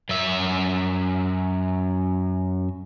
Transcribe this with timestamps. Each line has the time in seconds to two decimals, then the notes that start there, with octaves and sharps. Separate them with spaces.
0.09 F#2 E5